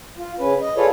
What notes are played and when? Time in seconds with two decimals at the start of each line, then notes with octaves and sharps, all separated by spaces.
0.18 F4
0.39 C#3 C#4 B4
0.62 D#5
0.77 F4 G#4 A4 B4 C#5 D5